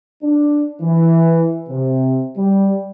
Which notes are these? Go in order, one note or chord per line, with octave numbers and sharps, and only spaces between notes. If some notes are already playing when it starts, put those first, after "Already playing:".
D4
E3
C3
G3